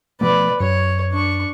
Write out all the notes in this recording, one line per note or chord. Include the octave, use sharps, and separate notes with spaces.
B2 F3 A3 B4 D5
F#2 C#5
D4 C#6